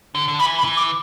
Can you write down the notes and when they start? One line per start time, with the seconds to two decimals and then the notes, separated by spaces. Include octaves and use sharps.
0.15 D3
0.28 D3
0.39 E3 B5
0.58 B5
0.64 E3
0.77 D6